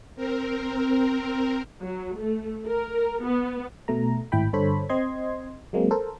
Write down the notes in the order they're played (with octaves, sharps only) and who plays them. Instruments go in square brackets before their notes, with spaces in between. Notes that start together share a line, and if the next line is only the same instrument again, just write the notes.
[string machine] C4 A#4
[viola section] F#3
A3
A#4
B3
[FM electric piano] B2 A3 A#5
G#1 A2 E4 G5 B5
G2 D3 A4 C5 C#5 B5
C4 D#5 C6 G#6
F#3 G#3 A#3 C4
A4 A#4 C5